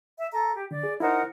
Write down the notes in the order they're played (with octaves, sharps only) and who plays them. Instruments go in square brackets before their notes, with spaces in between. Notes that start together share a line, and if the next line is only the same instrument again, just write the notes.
[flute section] E5
A4 A#5
G4
[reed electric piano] D3 [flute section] D5
[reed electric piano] G#4
[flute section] D#4 A#4 F#5 [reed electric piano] E4 C5